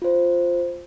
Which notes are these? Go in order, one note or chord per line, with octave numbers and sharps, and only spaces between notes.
F4 C5